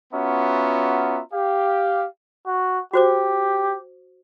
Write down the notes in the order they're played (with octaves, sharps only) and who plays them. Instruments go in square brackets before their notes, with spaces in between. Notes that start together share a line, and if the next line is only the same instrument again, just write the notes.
[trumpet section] B3 C#4 F4 F#4 E5 A#5
G4 F5
[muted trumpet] F#4
[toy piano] F#4 C5 D6 [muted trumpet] G4